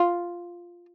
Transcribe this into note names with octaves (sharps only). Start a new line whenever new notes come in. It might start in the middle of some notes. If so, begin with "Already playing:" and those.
Already playing: F4